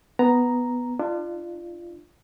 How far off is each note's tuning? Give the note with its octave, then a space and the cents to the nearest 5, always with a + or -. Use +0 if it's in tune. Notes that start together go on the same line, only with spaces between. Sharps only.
B3 +0 A#5 +0
D4 +30 F4 -20